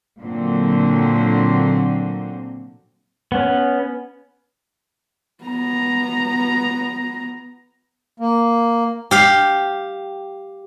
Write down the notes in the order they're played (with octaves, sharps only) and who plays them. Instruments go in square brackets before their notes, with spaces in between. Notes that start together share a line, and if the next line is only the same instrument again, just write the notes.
[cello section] A#2 D3 F#3 C4
[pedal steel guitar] B3 C#4
[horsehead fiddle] B3 A#5
[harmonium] A#3
[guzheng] G4 F5